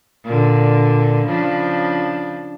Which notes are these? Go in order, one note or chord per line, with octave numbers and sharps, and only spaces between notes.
A#2 D3
C#3 F3 D4